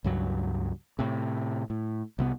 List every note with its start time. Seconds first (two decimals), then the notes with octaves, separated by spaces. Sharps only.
0.04 C#2 G2 F#3
0.99 A2 C3
1.70 A2
2.19 C2 C3 B3